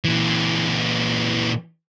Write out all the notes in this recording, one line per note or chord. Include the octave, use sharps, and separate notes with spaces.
A#2 E3